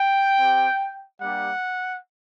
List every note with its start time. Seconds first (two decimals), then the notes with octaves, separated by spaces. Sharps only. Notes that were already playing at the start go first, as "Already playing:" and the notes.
Already playing: G5
0.38 C4 G4
1.21 G3 A#3 D4 G4 F#5